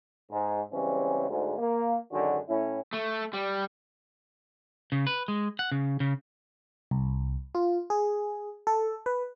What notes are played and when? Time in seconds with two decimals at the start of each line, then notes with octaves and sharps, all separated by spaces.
0.31 G#2
0.72 C#3 E3 G3 G#3 C4 C#4
1.30 D2 G#2
1.59 A#3
2.12 F#2 D3 D#3 G#3 D4 F#4
2.49 A2 C#4 E4
2.93 A3
3.33 G3
4.92 C#3
5.07 B4
5.28 G#3
5.59 F#5
5.72 C#3
6.00 C#3
6.91 C2
7.55 F4
7.90 G#4
8.67 A4
9.06 B4